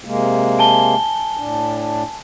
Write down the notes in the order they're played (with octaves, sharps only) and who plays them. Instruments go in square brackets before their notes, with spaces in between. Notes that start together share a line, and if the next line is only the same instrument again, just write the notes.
[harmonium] C3 G#3 A#3
[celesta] G#5 A5 G7
[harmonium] A2 D4